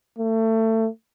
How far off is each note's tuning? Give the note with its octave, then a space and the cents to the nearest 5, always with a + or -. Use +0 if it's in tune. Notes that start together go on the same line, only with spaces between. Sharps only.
A3 +25